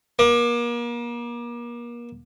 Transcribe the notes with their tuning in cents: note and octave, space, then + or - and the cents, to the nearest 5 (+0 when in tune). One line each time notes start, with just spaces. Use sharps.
A#3 +35